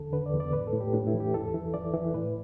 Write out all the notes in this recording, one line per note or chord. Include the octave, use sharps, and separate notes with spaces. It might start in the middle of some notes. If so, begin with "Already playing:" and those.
Already playing: E2 D3 A4
D3 B4
D5
E2
D5
A2 B4
A4
A2
G4
A2 D4
E4
E3
G4
E2 A4
E3
E3 D5
E3
A2 B4